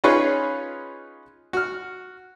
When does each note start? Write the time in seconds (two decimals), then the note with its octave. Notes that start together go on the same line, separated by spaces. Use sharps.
0.04 C#4 D#4 F4 G#4 B4 C#5
1.53 F#4 F6